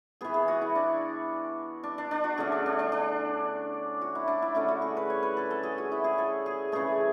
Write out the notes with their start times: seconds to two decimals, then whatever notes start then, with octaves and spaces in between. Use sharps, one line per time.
0.21 E3 B3 G#4
0.34 G#4
0.48 F#4
0.61 E4
0.75 D4
1.84 D4
1.98 D4
2.11 D4
2.24 F#4
2.37 D3 A3 C#4 G#4
2.52 D4
2.66 D4
2.79 D4
2.92 D4
4.01 F#4
4.15 E4
4.28 D4
4.42 E4
4.55 D3 A3 C#4 E4
4.68 F#4
4.82 G#4
4.97 B4
5.10 C#5
5.23 B4
5.37 A4
5.51 A4
5.63 G#4
5.78 F#4
5.92 E4
6.04 G#4
6.18 A4
6.46 G#4
6.72 C#3 E3 A3 G#4